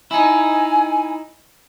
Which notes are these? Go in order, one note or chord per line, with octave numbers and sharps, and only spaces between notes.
D#4 E4 G#5